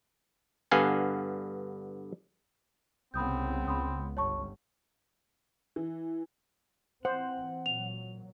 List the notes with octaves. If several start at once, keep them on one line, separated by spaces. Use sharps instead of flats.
G2 D3 B3 F5 F#5 G#5
C2 C#3 B3 C4 B5 D#6 G6
C#2 B5 C6 D#6
G1 C#5 A5 C#6
E3
E3 C4 C5 F#5
A#2 F#3 F7